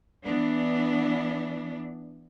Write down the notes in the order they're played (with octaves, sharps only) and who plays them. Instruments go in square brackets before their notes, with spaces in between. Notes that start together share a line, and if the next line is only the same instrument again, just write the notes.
[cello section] E3 B3 D4